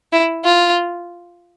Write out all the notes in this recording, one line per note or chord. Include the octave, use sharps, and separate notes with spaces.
E4
F4